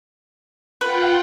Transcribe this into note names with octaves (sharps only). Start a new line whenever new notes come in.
F4 B4 F#5 G5